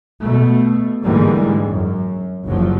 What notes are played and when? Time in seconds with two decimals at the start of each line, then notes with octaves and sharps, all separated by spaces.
0.21 B2 A3
1.02 G#2 D3 E3 G3 G#3 A#3
1.66 F#2
2.45 F#1 G2 F3 F#3